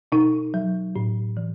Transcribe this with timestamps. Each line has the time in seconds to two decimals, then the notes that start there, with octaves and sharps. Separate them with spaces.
0.12 B2 D#4
0.54 F#3
0.96 A2
1.37 E3